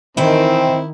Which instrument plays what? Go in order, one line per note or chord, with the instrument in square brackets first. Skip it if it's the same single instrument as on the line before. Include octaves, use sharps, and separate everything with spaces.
[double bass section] D#3 [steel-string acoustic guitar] E3 G5 G#5 [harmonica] C4 [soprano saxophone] E4